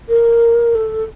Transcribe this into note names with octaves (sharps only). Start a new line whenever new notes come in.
A#4
A4